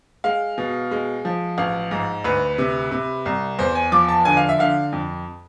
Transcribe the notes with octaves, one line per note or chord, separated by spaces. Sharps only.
G#3 F5
B2
G#3
F3
A1 F5
G#2
D2 B4
C3
C3
C2
E2 C5
G#5
F3 D6
A5
D3 G#5
F5
E5
D3 F5
F2